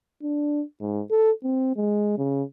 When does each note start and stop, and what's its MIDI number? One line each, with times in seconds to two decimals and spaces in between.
0.23 0.63 62
0.81 1.02 44
1.11 1.31 69
1.43 1.73 60
1.76 2.17 56
2.18 2.43 49